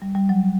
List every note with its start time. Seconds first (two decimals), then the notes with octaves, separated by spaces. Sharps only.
0.02 G3
0.15 G3
0.29 F#3